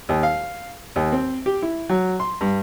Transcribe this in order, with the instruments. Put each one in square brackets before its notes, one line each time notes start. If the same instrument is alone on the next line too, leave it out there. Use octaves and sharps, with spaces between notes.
[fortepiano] D#2
F5
D#2
C4
G4
E4
F#3
C6
G2